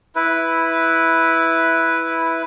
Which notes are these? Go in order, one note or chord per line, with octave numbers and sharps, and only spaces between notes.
E4 B4